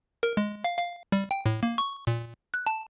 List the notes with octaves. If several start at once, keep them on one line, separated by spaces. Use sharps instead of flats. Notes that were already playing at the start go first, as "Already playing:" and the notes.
A#4
G#3
F5
F5
G3
G5
A2
A#3
C#6
A#2
F#6
A5